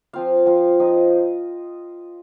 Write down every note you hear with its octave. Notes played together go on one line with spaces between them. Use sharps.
F3 C4 F4 F5
F3 C4 F4
F3 C4 D#4 D#5